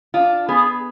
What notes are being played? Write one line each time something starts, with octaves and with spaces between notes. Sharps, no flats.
D4 F4
B3 G#4